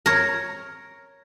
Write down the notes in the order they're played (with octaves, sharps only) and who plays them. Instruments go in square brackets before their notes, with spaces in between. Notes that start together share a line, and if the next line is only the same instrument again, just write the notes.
[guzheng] A#4 C#5